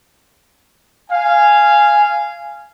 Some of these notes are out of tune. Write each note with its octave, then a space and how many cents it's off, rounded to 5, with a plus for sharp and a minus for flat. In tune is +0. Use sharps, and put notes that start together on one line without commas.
F5 -15 G#5 +0